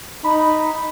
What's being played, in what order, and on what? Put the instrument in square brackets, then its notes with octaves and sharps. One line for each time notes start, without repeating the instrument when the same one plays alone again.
[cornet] D#4 [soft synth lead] B5